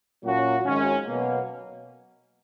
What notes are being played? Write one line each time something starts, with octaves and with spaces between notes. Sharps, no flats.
A#2 F#3 A#3 C#4 F#4
G#1 F#2 D#3 G#3 C#4
B2 F#3 A#3